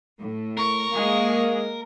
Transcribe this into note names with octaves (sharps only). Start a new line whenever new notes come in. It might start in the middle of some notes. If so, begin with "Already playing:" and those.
A2
A#4 C#6
G#3 A#3 G#4